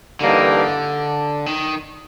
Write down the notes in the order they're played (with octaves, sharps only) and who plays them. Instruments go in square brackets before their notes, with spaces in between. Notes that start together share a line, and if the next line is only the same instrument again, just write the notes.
[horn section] G2 E3 G3 A#3 D#4 [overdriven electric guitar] D3
[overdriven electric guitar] D#3